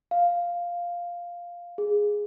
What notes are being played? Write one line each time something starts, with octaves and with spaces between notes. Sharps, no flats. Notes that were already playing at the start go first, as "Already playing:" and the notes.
F5
G#4